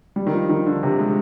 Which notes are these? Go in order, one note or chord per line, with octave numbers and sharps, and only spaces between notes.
G3
D#3
F3
D#3
D3
C3
G#3